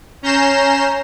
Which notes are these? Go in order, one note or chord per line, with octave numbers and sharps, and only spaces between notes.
C#4 A#5 G6 A#6 C7 E7